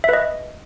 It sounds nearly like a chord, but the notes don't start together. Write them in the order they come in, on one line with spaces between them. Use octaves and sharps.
E5 B4 D#5